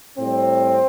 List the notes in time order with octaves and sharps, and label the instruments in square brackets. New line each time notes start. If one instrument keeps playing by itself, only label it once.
[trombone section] A2 G3 C4